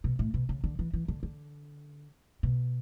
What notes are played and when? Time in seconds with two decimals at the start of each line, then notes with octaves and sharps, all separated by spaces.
0.04 B2
0.19 A2
0.34 B2
0.49 C#3
0.64 D3
0.79 E3
0.93 E3
1.08 D3
1.23 D3
2.43 B2